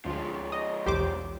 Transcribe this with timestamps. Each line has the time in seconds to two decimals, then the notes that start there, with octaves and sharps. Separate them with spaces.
0.05 D2 F3 G#3
0.52 D#5
0.86 B1 E2 G4 C5 D6